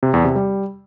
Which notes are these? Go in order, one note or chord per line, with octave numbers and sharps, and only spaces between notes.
C3
E2
C3
G3